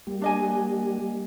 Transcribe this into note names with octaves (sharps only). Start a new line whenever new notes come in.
G3 A#3 G4
D4 D#5 G#5